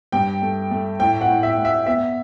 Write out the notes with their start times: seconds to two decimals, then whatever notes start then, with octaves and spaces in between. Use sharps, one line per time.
0.12 G2 G5
0.42 A3
0.71 A3
1.00 A2 G5
1.21 F#5
1.29 A2
1.43 E5
1.57 A2
1.65 E5
1.86 B3 E5